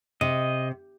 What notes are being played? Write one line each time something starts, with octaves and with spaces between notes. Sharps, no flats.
C3 D#5